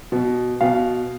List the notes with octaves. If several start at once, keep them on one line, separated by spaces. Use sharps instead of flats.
B2
B2 F5